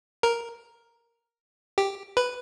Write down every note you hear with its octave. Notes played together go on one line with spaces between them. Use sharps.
A#4
G4
B4